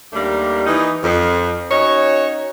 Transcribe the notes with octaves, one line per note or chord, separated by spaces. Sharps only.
D#2 G3 A3 A#3 D4
E3 D#4
F2
C#4 D#4 F#4 C#5